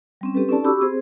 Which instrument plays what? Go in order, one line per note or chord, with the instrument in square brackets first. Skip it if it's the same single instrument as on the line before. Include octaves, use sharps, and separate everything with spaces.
[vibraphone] G3 C4 C#4
C4 G4 A4 B4
C#4 D#4 A4 D5 A5
F#4 G4 B5 C#6 D6 E6
C4 G#4 C5